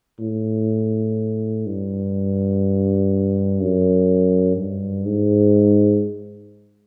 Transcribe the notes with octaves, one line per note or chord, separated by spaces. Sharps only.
A2
G2
F#2
G2
G#2